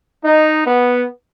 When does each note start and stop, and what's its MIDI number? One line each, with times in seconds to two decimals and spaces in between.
0.24 0.63 63
0.65 1.05 59